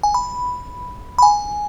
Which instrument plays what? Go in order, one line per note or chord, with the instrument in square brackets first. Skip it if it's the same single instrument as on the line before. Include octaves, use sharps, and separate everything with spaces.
[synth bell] G#5
B5
B5
G#5